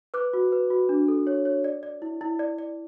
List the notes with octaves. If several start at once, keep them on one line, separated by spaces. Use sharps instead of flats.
B4 D6 F#6
F#4
B4
F#4
D4
A4
C#5
C#5
D5
D5
E4
E4
D5
D5